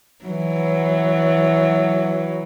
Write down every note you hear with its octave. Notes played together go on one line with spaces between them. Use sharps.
E3 F#3